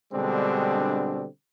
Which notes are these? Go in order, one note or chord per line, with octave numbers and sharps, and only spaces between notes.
B2 D3 G3 G#3 C4 D4